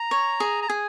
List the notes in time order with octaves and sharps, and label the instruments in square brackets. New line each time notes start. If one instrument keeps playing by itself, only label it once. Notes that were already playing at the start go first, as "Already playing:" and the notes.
Already playing: [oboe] A#5
[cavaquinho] C#5
G#4
[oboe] A#5
[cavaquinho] G#4 [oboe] G#5